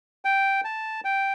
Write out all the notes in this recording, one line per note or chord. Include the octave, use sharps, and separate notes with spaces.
G5
A5
G5